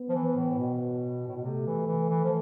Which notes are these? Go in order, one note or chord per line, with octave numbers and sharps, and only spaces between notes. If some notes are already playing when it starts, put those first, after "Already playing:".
Already playing: B3
F3
E3
A2
B2
A2
B2
C3 A3
E3
E3
E3
F3